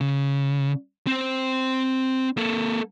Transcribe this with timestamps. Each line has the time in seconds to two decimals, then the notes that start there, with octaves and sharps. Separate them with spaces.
0.01 C#3
1.07 C4 C5
2.37 A#3 A4